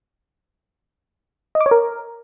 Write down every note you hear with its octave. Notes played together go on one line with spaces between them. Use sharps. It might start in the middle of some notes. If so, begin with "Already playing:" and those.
D#5
D6
C#5
A#4